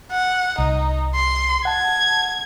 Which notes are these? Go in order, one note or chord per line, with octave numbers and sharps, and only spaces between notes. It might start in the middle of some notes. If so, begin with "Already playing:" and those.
F#5
C2 D#4
C6
F#5 A5 G#6